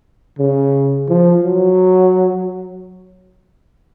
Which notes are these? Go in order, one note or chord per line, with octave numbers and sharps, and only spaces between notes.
C#3
F3
F#3